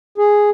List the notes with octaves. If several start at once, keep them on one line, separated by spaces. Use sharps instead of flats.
G#4